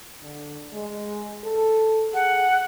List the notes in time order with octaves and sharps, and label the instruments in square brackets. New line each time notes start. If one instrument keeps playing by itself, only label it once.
[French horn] D3
G#3
A4
[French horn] G#4 [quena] F#5